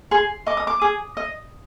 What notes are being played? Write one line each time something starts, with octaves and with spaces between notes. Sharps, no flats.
G#4 C6
D#5 D6
D#6
D6
G#4 D#6
D#5